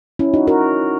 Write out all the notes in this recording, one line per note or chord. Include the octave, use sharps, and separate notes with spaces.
C#4 E4
D#4 F#4
F#4 A#4